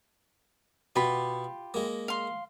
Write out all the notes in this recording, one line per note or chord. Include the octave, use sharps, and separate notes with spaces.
B2 F4 G4 B5
G#3 A#3
F5 C6